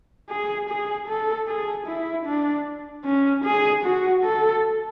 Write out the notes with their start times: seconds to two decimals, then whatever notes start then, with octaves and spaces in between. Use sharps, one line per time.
0.30 G#4
0.69 G#4
1.08 A4
1.48 G#4
1.87 E4
2.26 D4
3.05 C#4
3.45 G#4
3.84 F#4
4.24 A4